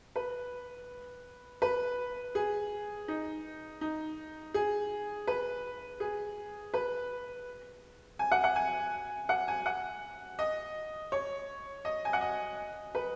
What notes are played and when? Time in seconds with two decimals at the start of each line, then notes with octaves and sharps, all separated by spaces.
0.16 B4
1.62 B4
2.35 G#4
3.08 D#4
3.81 D#4
4.54 G#4
5.27 B4
6.00 G#4
6.74 B4
8.19 G#5
8.31 F#5
8.44 F#5
8.56 G#5
9.29 F#5
9.48 G#5
9.66 F#5
10.39 D#5
11.12 C#5
11.85 D#5
12.05 G#5
12.13 F#5
12.21 D#5
12.95 B4